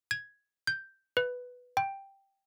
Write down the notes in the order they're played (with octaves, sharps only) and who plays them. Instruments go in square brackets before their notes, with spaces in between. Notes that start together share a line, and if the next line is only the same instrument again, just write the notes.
[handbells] G#6
G6
B4
G5